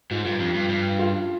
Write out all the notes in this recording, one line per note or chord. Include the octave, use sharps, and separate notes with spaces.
G#2 F4
G2 F4
F2
G2
G2
F4